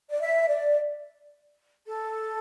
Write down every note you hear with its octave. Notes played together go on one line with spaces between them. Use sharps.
D5
E5
D5
A4